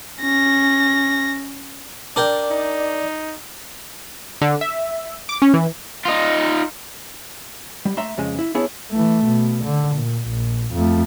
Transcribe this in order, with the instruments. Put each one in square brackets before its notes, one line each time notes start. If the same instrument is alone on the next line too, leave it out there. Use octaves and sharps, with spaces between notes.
[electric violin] C#4 A#6
[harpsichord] D4 A#4 G5 [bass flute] D5
[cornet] D#4
[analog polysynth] D3
E5
D6
C#4
E3
[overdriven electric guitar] D#4 F4
[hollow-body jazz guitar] G3
A3 E5 A#5 C6
F2 C#3 G#3
E4
B3 D4 E4 G#4 C#5
[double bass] E3 A3
B2
D3
A#2
A#1
F2 A3